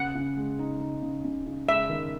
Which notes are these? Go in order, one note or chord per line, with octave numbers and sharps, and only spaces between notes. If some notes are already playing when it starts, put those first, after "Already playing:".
Already playing: C#3 F#5
C#3
G#3
D#4
D#4
C#3
C#3
C#3
G#3 E5
D#3